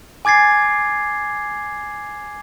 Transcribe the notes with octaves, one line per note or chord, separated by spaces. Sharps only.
G#5 D6 G#6 A6 C7